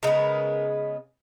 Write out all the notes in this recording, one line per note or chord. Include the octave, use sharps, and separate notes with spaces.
C#3 G#3 B3 A#4